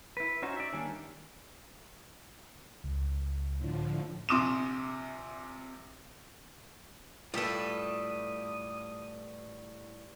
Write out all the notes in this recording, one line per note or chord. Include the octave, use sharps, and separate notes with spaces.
E4 B4
C#4 D#4 F#4 C5
D5 E5
D#3 G3 A#3 C#4 D4
C#2
A2 D3 F3
A#1 C3 C6 D6 D#6 E7
A2 G3 F4 G4 A4 B4 D#6